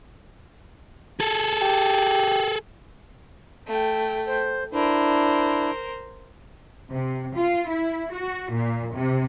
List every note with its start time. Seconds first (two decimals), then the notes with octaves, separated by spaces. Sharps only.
1.20 G#4 A4
1.62 G4
3.67 A3 G5
4.28 C5
4.73 D4 E4 A#4 C5
6.91 C3
7.35 F4
7.67 E4
8.13 F#4
8.50 A#2
8.94 C3